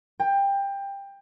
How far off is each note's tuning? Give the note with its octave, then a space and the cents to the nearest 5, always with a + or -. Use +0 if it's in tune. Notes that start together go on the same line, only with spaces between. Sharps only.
G5 +20